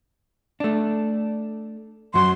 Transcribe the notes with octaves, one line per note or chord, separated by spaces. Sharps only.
A3 D4
F#2 F#3 C6